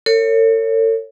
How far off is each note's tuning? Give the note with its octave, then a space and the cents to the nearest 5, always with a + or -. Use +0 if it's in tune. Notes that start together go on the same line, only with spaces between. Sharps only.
A4 +45 C#5 +0